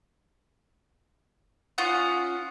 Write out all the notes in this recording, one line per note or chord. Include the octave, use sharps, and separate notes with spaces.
C#4 F4 F#5 D#6